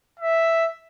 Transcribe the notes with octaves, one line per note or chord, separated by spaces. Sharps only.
E5